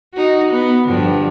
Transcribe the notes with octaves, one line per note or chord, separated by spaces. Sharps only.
D#4 F#4
B3
G2 D3 F3